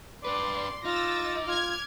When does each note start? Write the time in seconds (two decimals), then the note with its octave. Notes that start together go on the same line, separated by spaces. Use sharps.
0.25 D4 B4 D5 C6
0.85 D#4 F4 D6 E6 A6 A#6
1.47 F4 F6 G#6